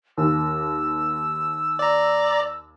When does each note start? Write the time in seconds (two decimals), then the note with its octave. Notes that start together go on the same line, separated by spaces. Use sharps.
0.18 D#2 E6
1.79 D5 A#5